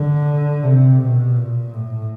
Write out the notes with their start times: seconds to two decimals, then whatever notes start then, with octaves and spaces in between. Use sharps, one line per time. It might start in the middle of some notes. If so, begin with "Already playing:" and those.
Already playing: D3
0.63 C3
1.00 B2
1.37 A#2
1.74 A2